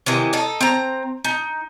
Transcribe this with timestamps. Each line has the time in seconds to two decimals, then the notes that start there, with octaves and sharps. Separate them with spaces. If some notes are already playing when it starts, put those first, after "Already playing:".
0.06 C3 D#3 E3
0.33 D#4 A4
0.61 C4 A#5
1.24 D#4